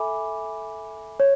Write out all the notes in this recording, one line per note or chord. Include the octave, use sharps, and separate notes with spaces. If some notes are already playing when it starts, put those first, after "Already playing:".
Already playing: A4 E5 G#5 B5 D6
C#5